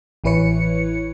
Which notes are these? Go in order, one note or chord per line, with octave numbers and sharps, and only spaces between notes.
A1 E3 E4 B4 C#5 C#7